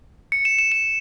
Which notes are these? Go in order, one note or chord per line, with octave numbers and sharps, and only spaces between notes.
C#7
E7
E7
E7